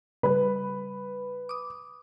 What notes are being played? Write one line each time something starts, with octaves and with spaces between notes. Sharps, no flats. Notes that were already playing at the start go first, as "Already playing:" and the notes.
C#3 G3 B4
D6 D#6